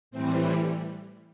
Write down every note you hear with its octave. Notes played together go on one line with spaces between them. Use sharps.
A2 E3 G3 C4 C5